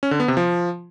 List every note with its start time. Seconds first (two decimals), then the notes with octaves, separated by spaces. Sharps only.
0.03 C#4
0.11 D3
0.20 B3
0.28 C3
0.37 F3